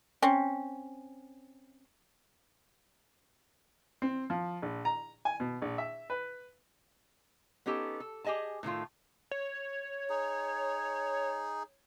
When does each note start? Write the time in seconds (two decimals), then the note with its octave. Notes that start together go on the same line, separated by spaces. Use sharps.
0.22 C4 C#4
4.02 C4
4.30 F3
4.62 A#1
4.85 A#5
5.25 G#5
5.40 B2
5.62 A#1
5.78 E5
6.10 B4
7.66 B3 C#4 D#4 G4 A4
8.00 A4
8.24 G4 G#4 D#5 G#5 A5
8.63 A2 D#3 A3 F4
9.32 C#5
10.09 D#4 G#4